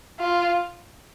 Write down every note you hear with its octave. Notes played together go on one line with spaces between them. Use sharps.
F4